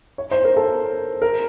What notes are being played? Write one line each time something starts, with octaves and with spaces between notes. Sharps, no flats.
C#5
C5
A#4
A4
A#4